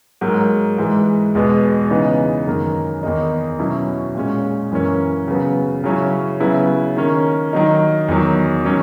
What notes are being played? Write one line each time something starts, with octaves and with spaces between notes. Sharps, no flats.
G#2 F#3 A#3
G#2 E3 G#3
E2 B2 G#3 B3
C#3 E3 B3 D#4
F#2 D#3 A#3
E2 D#3 A#3 D#4
B2 F#3 C#4 E4
A#2 G#3 C#4
F#2 E3 A#3 C#4
C#3 F#3 B3
C#3 F#3 C#4 E4
C#3 F#3 B3 E4
D#3 A#3 C#4
D#3 F#3 A#3 D#4
E2 D#3 F#3
D#3 F#3 C#4